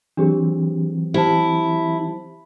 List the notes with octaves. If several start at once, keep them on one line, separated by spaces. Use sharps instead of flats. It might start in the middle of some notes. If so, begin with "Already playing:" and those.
E3 F#3 C4 D4 G4 G#4
E4 G4 C5 A5